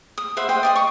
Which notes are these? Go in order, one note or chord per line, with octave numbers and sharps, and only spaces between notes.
D#6
B4 C5 E5 F#5
C5 D#5 G5
D5 D#5 D#6
C#6